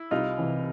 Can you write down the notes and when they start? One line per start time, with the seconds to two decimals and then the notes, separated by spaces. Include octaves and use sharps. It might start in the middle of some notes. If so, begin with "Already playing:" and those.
Already playing: E4
0.11 C2 D#4 F4
0.39 C3 E3